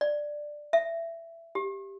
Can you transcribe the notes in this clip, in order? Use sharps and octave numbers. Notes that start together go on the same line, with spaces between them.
D5
E5
G4